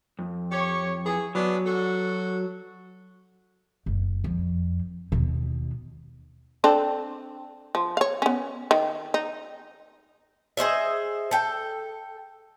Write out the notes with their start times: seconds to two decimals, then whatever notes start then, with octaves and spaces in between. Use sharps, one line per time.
0.19 F2
0.52 G4 C#5
1.06 E3 G#4
1.35 F#3 B3 D4
1.66 F#4 A4 F#5
3.86 F#1
4.24 F2
5.12 D#2 B2
6.64 C4 D4 A4
7.75 F3
7.97 C#5 F5
8.22 B3 C#4
8.71 D#3
9.14 D#4
10.57 G#4 C5 D#5 E5
11.31 A4 G5